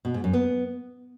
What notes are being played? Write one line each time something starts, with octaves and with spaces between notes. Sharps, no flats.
B2
G#2
F#2
B3